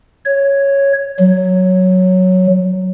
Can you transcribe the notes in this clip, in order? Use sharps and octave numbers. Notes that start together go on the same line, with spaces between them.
C#5
F#3